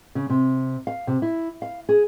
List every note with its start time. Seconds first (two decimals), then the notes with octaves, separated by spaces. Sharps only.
0.15 C#3
0.30 C3
0.87 F5
1.07 C3
1.22 E4
1.62 F5
1.89 G#4